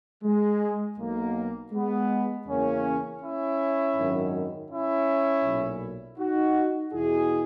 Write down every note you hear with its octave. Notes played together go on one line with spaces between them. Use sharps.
G#3
B1 B2 A#3
G#3 B3
E2 C#3 E3 A#3 C#4
C#4 E4
G#1 F#2 D#3
C#4 E4
B1 A#2
D#4 F#4
E2 B2 E4 G#4